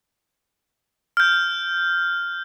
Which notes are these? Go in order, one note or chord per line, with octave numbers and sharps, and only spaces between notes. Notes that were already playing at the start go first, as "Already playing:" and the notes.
F6 G6